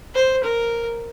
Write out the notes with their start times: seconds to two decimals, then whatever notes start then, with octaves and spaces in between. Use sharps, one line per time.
0.15 C5
0.44 A#4